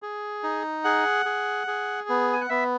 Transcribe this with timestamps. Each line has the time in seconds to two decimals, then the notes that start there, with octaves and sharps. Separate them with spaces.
0.02 G#4
0.43 D#4
0.84 G#4 F#5
1.26 G#4
1.67 G#4
2.09 B3
2.33 G#5
2.41 F#5
2.49 B3 E5